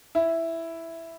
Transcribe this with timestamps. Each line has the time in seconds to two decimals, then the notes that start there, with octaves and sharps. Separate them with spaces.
0.15 E4